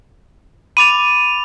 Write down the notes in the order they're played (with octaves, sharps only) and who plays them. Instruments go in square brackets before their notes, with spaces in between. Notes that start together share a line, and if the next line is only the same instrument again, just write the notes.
[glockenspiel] B5 D6 A6 [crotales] D#7 F7